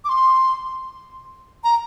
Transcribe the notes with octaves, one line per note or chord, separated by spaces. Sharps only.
D6
C6
A#5